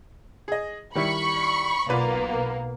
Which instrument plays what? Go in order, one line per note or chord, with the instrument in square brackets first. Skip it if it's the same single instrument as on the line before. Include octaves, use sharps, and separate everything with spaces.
[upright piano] G#4 D#5
[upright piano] D#3 G3 E4 [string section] B5 C#6
[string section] B1 A#3 B3 [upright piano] F4 B4 D5